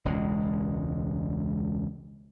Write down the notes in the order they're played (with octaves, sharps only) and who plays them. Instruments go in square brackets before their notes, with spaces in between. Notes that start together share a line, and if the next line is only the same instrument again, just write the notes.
[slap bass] E1 C#2 G#3